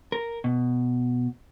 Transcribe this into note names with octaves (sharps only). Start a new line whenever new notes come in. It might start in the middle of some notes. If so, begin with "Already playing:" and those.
A#4
B2